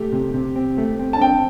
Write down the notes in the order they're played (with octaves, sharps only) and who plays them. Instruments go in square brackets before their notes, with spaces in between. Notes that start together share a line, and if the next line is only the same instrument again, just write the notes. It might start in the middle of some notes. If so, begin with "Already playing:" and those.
Already playing: [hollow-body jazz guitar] A3 [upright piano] G4
[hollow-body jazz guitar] C3
C3
C4
A3
C4
[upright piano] A5
[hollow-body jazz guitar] C4 [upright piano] G5